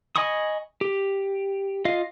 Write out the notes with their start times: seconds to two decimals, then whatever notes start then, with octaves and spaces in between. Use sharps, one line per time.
0.16 D#5 G#5 B5 C#6 D#6
0.81 G4
1.85 F4 D#5 F5